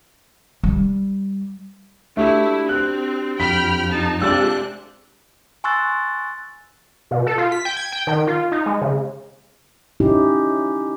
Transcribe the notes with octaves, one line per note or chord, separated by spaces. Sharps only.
G3
A3 D4 E4 F#4 G4
C4 F#6
F2 G5 B5 F6 B6
D#4 A5
C3 G#3 D4 F4 G4 E6 F#6 A6
G#5 C6 C#6 E6 F#6 A6
B2
A4
F4
B6
G5
G#6
G5
D#3
F4
D#4
G#3
C#3
C#4 D#4 E4 G4